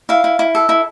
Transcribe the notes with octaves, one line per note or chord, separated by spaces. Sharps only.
E4 F5
E4
E4
A4
E4